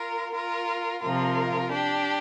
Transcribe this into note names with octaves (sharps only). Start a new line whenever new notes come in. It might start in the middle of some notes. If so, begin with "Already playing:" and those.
Already playing: F4 A#4
F4 A#4
C3 F3 F4 A#4
D4 G4